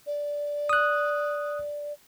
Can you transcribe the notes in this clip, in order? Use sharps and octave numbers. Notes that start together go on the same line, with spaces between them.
D5
D#6 F#6